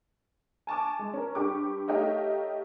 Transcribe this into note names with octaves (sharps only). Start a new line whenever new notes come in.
G#5 A5 C#6 D6
G#3
C#4 A#4
G2 G4 C#6 D6
A3 D#4 G4 C#5 D#5 F5